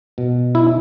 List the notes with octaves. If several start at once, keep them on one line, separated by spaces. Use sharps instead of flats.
B2
E4